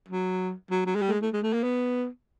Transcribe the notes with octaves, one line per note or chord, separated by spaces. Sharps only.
F#3
F#3
F#3
G#3
G3
A3
G#3
A3
G#3
A3
A#3
B3